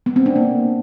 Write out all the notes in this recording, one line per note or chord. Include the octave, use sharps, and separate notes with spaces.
B3
C4
D4
A#3